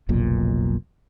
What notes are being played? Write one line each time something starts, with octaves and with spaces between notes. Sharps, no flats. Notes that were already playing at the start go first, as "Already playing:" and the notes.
F1 B1 A#2